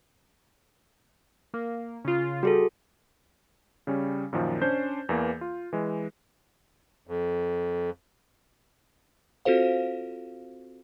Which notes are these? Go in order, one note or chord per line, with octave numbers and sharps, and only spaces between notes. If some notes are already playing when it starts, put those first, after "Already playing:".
A#3
C#3 F4
G3 F#4 G#4 A4
C#3 G3 C#4
F#2 A#2 D#3 F3
C#4 D4 C5 G6
E2 E3 A#3
F4
E3 G#3
F2
C4 F4 F#4 A4 C5 F5